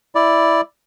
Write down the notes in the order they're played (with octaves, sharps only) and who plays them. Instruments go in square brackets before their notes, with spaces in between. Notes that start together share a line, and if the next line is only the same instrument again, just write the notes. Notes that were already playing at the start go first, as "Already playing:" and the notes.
[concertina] E4 D5